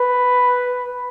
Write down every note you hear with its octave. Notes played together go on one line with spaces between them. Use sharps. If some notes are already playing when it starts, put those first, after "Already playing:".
Already playing: B4